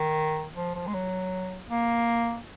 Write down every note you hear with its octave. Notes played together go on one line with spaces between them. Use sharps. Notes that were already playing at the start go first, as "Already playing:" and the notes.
Already playing: D#3
F3
F3
G#3
F#3
A#3